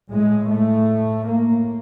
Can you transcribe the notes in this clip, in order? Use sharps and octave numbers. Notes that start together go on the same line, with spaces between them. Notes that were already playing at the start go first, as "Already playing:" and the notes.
A2 G#3
A3
A#3